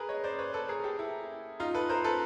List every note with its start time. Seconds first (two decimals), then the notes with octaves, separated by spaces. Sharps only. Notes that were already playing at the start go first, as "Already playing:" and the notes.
Already playing: G#4 A#4 B4
0.09 C#5 D#5
0.24 C5 D5
0.39 B4 C#5
0.53 A4 B4
0.68 G#4 A#4
0.79 A#4
0.84 G4 A4
0.99 E4
1.60 D#4 F4
1.74 A4 B4
1.89 A#4 C5
2.04 A4 B4